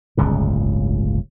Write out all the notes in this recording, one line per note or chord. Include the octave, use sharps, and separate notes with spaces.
D1 G1 C#2 C#3